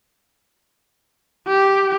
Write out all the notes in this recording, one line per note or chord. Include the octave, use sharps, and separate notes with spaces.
G4